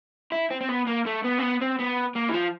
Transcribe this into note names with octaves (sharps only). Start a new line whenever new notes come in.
E4
C4
C4
B3
A#3
A3
B3
C4
B3
C4
B3
A#3
E3
F3